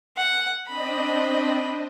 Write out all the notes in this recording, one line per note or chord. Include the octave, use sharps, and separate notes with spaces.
F#5
C4 D4 D#5 B5